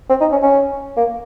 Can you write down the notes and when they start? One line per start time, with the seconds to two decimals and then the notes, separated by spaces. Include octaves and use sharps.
0.10 C4
0.21 D#4
0.32 C#4
0.42 C#4
0.97 A#3